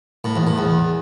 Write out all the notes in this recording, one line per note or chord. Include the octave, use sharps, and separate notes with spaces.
A2
E2
A2
E2